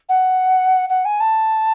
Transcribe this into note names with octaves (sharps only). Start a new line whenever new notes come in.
F#5
F#5
G#5
A5